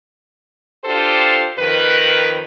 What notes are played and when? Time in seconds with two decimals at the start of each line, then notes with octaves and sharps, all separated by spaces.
0.84 D4 F4 G4 A4 C5
1.58 F2 D#3 A#4 B4